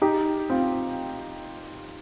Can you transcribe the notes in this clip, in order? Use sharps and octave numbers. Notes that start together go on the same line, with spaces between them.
D#4 G4
C4 F4